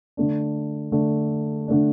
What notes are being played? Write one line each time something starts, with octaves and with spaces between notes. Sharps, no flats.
D3 A3 D4
D3 A3 D4
D3 A3 D4